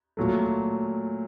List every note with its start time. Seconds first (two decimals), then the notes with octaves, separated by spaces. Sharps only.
0.17 A#2 F#3 A3